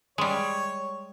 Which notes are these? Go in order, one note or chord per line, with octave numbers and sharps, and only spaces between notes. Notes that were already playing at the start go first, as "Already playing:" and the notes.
G3 G#3 C#5